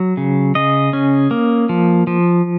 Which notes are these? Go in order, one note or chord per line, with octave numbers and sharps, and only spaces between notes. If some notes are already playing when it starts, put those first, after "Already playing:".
Already playing: F#3
C#3
C#3 D#5
C#4
A#3
F3
F3